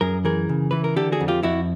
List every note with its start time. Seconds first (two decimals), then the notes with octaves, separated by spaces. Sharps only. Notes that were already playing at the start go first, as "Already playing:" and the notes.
0.01 F#2 G#4 A#4
0.25 E3 G#4 A#4
0.49 C#3
0.71 E3 B4
0.84 A#4
0.96 D3 G4 A4
1.12 F#4 G#4
1.20 F2
1.28 F4 G4
1.43 F2 E4 F#4